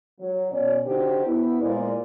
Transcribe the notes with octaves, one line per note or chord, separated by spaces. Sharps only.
F#3
B2 C#4 C#5 D5
D3 D#4 F#4 G4 C5
B3 E4
A#2 G#3 A#3 C5 D5